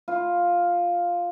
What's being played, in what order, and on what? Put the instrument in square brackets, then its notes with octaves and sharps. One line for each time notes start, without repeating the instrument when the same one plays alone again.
[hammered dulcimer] F4